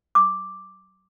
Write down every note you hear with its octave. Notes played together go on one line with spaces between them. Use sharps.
D6